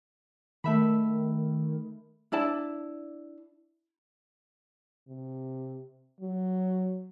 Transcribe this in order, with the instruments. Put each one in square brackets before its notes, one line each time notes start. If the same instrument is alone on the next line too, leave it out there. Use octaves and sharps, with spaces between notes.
[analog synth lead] D#3 [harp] A3 E5 B5
[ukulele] D4 E4 D5 A5
[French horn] C3
F#3